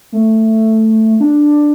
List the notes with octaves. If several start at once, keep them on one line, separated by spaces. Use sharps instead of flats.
A3
D4